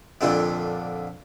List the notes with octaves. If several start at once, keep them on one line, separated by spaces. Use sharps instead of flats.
F2 A#2 D3 D4